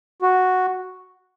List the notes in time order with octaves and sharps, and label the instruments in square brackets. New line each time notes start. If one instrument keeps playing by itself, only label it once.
[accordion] F#4